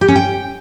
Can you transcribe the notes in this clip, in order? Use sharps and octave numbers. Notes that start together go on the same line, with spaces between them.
G4
C#4
G5